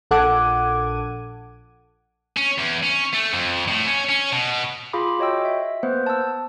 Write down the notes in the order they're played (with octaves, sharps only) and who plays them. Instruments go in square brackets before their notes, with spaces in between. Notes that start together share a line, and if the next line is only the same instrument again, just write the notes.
[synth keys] A#1 A4 F#5 D6 G#6 D#7
[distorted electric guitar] C#4
E2
C#4
A3
F2
A2
C#4
C#4
B2
[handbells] F4 G#4 F5 B5 D6
F#4 C#5 D#5 G5 E6
E5
A#3 B3 B4 C5
A5 E6